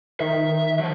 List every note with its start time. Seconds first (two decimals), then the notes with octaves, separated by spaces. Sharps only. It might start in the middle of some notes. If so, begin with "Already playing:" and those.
0.20 D#3 E5
0.79 F3 F#3